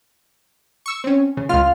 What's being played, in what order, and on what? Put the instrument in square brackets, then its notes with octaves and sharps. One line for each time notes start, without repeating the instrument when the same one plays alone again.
[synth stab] C#6 E6
C4 C#4
C#3
[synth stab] C#2 F6 [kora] F4